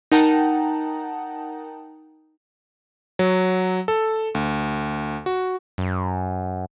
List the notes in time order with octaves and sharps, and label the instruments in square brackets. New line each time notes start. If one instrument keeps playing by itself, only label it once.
[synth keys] D#4 A#4 F#5 G5 A5 A#5
[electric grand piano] F#3
A4
D2
F#4
[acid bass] F#2